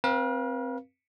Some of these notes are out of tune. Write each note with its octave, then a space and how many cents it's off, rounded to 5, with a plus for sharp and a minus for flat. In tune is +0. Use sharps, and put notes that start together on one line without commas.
C4 +0 B4 -45 F5 +0